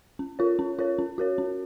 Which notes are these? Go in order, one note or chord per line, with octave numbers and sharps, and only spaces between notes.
C#4
F4 A#4 C#5
C#4
F4 A#4 C#5
C#4
F#4 A#4 C#5
C#4